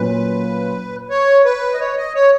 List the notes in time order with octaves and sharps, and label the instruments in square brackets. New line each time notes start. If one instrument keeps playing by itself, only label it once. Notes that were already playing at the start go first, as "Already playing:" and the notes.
Already playing: [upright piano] A#2 F#3 C#4 F4 [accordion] B4
[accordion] C#5
B4
D#5
C#5
D#5
C#5